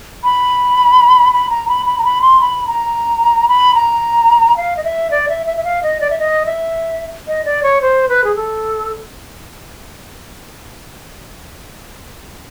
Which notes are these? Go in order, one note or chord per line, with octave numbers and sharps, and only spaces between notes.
B5
B5
A#5
B5
B5
A#5
B5
C6
B5
A#5
B5
A#5
F5
D#5
E5
D5
E5
E5
E5
F5
D#5
D5
E5
D#5
E5
D#5
D5
C#5
C5
B4
G#4
A4